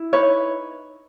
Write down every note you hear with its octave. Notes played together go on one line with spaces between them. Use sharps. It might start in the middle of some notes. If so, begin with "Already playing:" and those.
Already playing: E4
D#4 B4 C#5